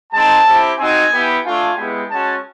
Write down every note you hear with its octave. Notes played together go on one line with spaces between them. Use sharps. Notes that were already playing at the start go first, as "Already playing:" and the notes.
G#3 C4 D#4 A5
C4 E4 G4
C4 D#4 F#4 G#5
B3 E4 G4
A3 D4 F4 G#5
G#3 B3 E4 G4
G#3 C#4 F#4 A5